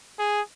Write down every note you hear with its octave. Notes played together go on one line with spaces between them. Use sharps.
G#4